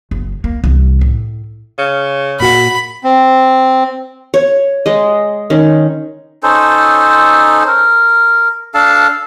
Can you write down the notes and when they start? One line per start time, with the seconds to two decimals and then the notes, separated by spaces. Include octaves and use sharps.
0.11 F#1
0.44 A#3
0.64 C2 E3
1.01 A2
1.79 C#3
2.40 A#2 F#4 F#5 B5
3.04 C4
4.34 C#5
4.86 G#3 D#5
5.50 D#3 C#4
6.43 C#4 D#4 A4 C5
7.67 A#4
8.74 D4 A4 F5 A5